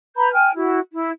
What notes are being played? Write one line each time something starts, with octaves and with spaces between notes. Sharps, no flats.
B4 A#5 B5 G6
G5 G#5 F6
E4 F#4
E4